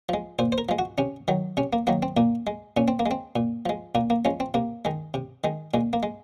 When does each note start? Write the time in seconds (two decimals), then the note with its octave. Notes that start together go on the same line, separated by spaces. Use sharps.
0.09 F3 G#3
0.39 A#2 C5
0.52 C5
0.58 A#4
0.69 F3 G#3
0.79 F#4
0.98 C3 C#4
1.28 D#3 F#3
1.57 C3 C#4
1.73 A#3
1.87 D#3 F#3 A#3
2.03 C4
2.17 A#2 A#3
2.47 G#3
2.77 A#2 C#4
2.88 C4
2.99 A#3
3.06 G#3
3.11 C4
3.36 A#2
3.66 F3 G#3
3.95 A#2 A#3
4.10 A#3
4.25 F3 G#3 C#4
4.40 C4
4.54 C3 A#3
4.85 D#3 G#3
5.14 C3
5.44 D#3 G#3
5.74 A#2 G#3
5.93 A#3
6.03 G#3